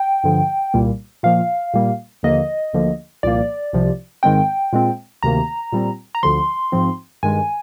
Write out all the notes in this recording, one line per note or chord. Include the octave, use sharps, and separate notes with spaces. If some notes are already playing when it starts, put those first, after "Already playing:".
Already playing: G5
G2 D3 F3
C2 A#2 G3 A#3
A#2 F3 A#3 F5
A#2 G3 A#3
D#2 D3 F3 A#3 D#5
D2 D3 F3 A#3
C2 A#2 F3 A#3 D5
C2 C3 F3
G#2 D#3 G#3 C4 G5
A#2 G#3 C4
D2 C3 D#3 A#3 A#5
A#2 G3 C4
A#5
D2 D3 F3 C6
G#2 F3 C4
G2 D#3 G#3 G#5